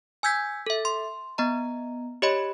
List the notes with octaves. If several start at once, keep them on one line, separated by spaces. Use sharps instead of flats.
G#5 E6 G6 G#6 B6
A4 E5
C6
B3 D#5 A#5
G4 C#5 D#5 B5